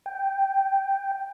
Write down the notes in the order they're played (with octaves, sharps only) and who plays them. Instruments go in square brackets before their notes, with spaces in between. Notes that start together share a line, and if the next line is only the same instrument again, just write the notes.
[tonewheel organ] G5